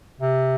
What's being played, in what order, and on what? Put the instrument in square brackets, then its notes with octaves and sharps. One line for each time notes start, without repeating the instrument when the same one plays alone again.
[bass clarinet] C3